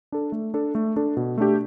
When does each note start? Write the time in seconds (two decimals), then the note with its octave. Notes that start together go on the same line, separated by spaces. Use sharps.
0.12 D4 A4
0.32 A3
0.54 D4 A4
0.75 A3
0.96 D4 A4
1.17 B2
1.38 A3 D4 G4